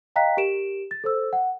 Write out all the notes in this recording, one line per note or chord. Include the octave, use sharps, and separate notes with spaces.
D#5 F5 G5 A#5 F#6 B6
G4 A#4 D7 E7
A6
A4 C5 E6
F#5